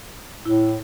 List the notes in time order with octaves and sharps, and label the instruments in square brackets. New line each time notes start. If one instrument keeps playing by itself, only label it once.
[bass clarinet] A2 [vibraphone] E4